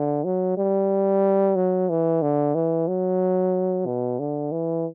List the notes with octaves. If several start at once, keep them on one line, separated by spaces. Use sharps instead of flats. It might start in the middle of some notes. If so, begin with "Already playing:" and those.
Already playing: D3
F#3
G3
F#3
E3
D3
E3
F#3
B2
D3
E3